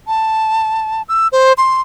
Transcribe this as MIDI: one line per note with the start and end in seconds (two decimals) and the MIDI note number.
0.07 1.02 81
1.09 1.28 88
1.32 1.53 72
1.58 1.81 84